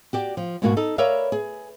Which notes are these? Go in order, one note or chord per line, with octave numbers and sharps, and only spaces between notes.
F#4 G4 D5
F3
G#2 B2 A#3 E4 F#4
D#4 A4
A#4 B4 C#5 D5 E5 F5
G#4